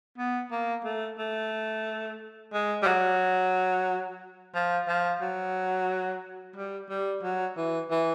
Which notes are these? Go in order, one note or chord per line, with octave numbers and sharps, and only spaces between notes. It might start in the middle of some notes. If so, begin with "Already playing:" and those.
B3
A#3
A3
A3
G#3
G3
F#3
F3
F3
F#3
G3
G3
F#3
E3
E3